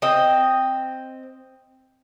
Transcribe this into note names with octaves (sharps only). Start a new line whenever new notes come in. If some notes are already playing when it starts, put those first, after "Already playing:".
C4 D#5